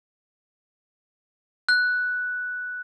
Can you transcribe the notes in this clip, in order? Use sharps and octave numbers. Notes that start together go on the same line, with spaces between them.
F#6